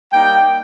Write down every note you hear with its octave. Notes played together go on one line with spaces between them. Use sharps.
G3 A#3 D#4 G5